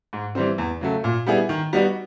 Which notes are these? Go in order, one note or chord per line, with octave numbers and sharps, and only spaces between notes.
G#2
E3 G3 C4
E2
C#3 F#3 A3
A#2
G3 B3 E4 G#4
D#3
G3 B3 D#4 F#4